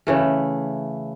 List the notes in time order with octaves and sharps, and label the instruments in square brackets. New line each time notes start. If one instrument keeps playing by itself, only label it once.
[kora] C#3 E3 A3